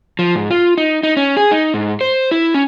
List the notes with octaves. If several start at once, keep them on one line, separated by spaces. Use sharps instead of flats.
F3
G#2
F4
D#4
D#4
C#4
G#4
D#4
G#2
C5
E4
C#4